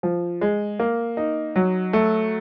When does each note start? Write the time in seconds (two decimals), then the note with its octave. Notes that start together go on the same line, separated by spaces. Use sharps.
0.03 F3
0.41 G#3
0.79 A#3
1.17 D#4
1.56 F#3
1.93 A3